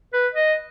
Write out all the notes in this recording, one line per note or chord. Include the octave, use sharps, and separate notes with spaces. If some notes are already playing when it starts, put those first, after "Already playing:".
B4
D#5